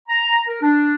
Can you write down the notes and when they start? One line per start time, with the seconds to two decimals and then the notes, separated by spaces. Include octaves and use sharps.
0.09 A#5
0.47 A#4
0.62 D4